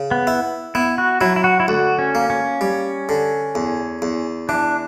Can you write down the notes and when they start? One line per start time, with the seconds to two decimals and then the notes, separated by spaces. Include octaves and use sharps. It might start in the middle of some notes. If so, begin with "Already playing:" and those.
Already playing: C#3
0.11 B3
0.27 E4
0.75 B3 E4
0.98 F#4
1.21 F#3 E4
1.36 E4
1.44 F#4
1.60 E4
1.68 D2 F#4
1.99 C#4
2.15 A#3
2.30 C#4
2.61 G3
3.09 D3
3.55 E2
4.02 E2
4.49 E3 D4